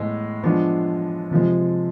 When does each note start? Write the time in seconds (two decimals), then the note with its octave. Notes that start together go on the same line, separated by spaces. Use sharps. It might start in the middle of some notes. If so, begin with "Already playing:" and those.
Already playing: A2 G#3 B3
0.43 F3 G#3 B3 D4
1.31 C3 F3 G#3